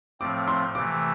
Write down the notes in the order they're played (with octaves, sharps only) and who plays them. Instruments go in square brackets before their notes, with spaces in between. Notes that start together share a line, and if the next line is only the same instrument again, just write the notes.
[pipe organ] A2 F3 A3 C4 [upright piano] D6
[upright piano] C6
[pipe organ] C3 E3 A3 [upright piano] D6